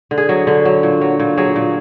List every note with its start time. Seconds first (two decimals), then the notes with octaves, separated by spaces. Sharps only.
0.11 D3
0.18 G#4
0.29 F#3
0.47 D3
0.65 F#3
0.83 A#2
1.01 F#3
1.20 A#2
1.37 F#3 G#4
1.56 A#2